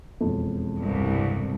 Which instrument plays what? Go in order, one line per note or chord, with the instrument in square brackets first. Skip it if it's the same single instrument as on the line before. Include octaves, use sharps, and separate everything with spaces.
[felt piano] E1 F2
[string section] C2 G2